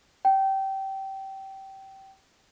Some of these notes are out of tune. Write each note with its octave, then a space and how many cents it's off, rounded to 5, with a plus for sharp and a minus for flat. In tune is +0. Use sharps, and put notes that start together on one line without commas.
G5 -20